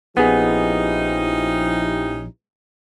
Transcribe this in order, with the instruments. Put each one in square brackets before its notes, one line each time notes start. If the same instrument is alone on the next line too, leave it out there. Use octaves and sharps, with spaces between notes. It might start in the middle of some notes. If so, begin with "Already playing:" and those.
[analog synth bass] A#1 [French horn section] F3 E4 G4 [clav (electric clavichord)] B3 G#4 [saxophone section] C#4 D#4